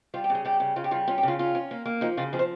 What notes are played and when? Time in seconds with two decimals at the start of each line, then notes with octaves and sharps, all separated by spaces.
0.14 G3 F4
0.24 G4
0.30 C#3 G#4
0.45 G3 G4
0.60 C#3
0.76 C#3 F4
0.84 G4
0.91 G3 F4
1.08 C#4 F4
1.18 G4
1.23 C#3 F4
1.39 C#4 F4
1.55 C#4
1.71 A#3
1.86 A#3
2.01 F3 D#4
2.17 C#3 F4
2.33 F3 G#4
2.39 C5